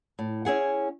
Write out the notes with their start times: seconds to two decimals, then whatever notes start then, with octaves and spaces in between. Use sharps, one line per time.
0.19 A2
0.45 C#4 E4 G#4 F#5